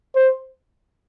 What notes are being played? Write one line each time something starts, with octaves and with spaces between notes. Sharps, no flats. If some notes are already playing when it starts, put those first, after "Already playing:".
C5